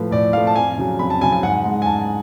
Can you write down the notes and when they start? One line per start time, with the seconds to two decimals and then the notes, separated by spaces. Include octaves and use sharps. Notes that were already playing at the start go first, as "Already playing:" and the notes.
Already playing: A2 F3 A3 B4
0.11 A2 D5
0.33 F3 A3 F5
0.47 A5
0.56 F2 G#5
0.78 C#3 F#3
0.99 F2 B5
1.10 A5
1.21 C#3 F#3 G#5
1.32 G#5
1.43 G#2 F#5
1.65 G#3
1.82 G#5
1.86 G#2 A5